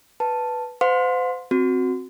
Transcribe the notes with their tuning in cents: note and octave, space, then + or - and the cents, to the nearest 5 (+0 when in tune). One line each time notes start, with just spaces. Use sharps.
B4 +0 A5 +0
C5 -40 F5 +45 C6 +0
C4 +0 F#4 -15